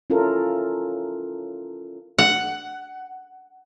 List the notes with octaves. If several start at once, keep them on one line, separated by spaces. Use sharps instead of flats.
C#4 E4 F4 A4 A#4
F#5